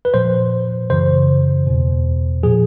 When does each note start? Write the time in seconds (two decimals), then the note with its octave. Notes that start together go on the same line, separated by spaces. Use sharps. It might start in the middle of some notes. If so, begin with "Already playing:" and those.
0.05 B4
0.14 A#2 F3 C5
0.90 F#2 C#3 E3 C5
1.67 E2 B2
2.43 A#2 F3 G#4